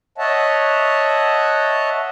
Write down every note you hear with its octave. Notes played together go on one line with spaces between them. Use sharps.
C#5 D#5 E5 F#5 A5